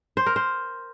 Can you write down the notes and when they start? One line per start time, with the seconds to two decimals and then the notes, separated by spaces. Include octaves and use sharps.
0.17 C5
0.26 A#4
0.36 C5